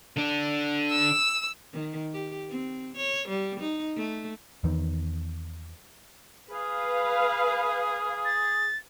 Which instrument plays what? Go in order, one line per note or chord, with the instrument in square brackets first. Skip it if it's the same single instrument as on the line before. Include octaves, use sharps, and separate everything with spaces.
[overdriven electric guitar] D3 D4
[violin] E6
[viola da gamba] D#3
G4
C4
C#5
G3
D#4
A3
[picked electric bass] E2 D#3
[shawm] G#4 [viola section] B4 F5
[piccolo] A6